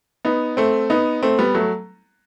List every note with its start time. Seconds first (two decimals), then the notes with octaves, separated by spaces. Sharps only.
0.25 B3 D#4
0.57 A3 C4
0.90 B3 D#4
1.22 A3 C4
1.39 G3 B3
1.55 F#3 A3